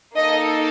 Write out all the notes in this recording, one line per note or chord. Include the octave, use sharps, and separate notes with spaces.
A#3 D#4 A4 D#5